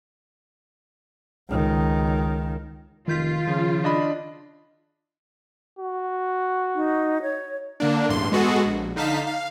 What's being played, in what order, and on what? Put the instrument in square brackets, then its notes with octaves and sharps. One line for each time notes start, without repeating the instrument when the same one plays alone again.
[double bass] C#2 D#3
[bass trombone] F1 [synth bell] D#3 G6 B6 [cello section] F4
[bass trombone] C#3 [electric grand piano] F3
[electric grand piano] D4 D#5 B5
[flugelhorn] F#4
[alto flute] D#4
C#5
[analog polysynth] D3 A#3 D4
A1 E2 G2 C6
G#3 B3 F#4 G#4 A4
A#1
D3 D#4 F5 A5 B6
F5